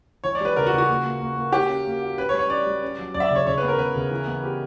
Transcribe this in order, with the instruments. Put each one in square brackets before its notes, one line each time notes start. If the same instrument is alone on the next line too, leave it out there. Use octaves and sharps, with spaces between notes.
[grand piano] E3 [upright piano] C#5
[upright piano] D5
[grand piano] G3 [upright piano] B4
[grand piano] C#3 [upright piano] A#4
[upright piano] F#4
[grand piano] C#3
[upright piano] F#4
[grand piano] A#2
A#3
A#3
A#3
[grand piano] F#4 [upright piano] G4
[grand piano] C#4
A#3
F#4
[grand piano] C#4 [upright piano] B4
[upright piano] C#5
[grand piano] G3
[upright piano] C#5
[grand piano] C#4 [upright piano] D5
[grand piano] G3
C#4
F#3
[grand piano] F#2 [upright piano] D5
[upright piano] E5
D5
[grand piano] C#3 [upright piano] C#5
[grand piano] C#3 [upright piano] C#5
[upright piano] B4
[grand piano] B3
[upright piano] A#4
[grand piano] C#3 [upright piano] B4
[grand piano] C#3
E3
B3
G4